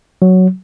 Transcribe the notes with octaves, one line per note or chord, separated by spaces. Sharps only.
F#3